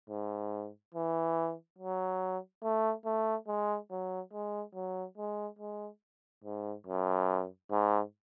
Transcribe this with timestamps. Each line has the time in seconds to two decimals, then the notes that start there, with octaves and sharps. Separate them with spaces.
0.10 G#2
0.95 E3
1.79 F#3
2.64 A3
3.06 A3
3.48 G#3
3.91 F#3
4.33 G#3
4.75 F#3
5.18 G#3
5.59 G#3
6.44 G#2
6.87 F#2
7.71 G#2